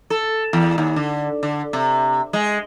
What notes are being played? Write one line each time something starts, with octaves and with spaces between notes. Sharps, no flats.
A4
E2
D#2
D3
D3
C3
G#3